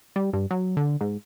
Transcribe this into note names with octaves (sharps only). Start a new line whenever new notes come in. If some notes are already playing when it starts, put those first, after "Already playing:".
G3
G2
F#3
D3
G#2